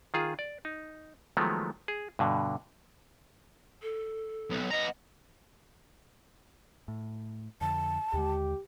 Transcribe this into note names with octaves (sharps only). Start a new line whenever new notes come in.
D#3 F4 G#4
D5
D#4
D#3 F3 F#3 G#3 A3 B3
G#4
G2 B2 D3
A4
B1
B3 D#5 A#5
A2
F2 D3 A5
D#2 D3 G#3 G4